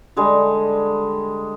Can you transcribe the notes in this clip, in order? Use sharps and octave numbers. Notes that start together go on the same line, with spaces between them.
D3 G3 G#3